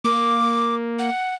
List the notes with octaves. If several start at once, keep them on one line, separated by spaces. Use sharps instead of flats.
A#3 D6
F#5